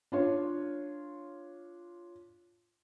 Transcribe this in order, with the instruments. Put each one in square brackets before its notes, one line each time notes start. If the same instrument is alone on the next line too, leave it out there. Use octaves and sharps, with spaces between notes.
[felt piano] D4 F4 C#5